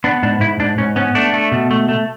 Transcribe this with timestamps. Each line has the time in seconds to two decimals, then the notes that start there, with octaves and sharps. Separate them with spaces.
0.04 B3 D4
0.23 G#2 D4
0.40 G#2 E4
0.60 G#2 D4
0.78 G#2 C#4
0.96 B3 C#4
1.15 A3 D4
1.34 A3
1.52 B2
1.71 A3
1.89 A3